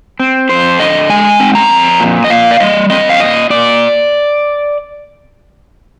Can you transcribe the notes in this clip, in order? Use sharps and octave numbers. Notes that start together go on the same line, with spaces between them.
C4
F2 C5
D3 D#5
G#3 G#5
C4
A#5
F2
A#2
D#5
A#2 F5
D5
G3 D#5
C4 D#5
F5
A#2 D#5
A#2 D5